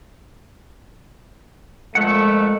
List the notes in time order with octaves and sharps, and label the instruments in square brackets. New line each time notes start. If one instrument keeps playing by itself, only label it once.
[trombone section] F2 A#2 A3 [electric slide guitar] G#3 F#5